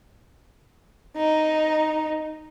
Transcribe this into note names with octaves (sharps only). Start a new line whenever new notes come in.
D#4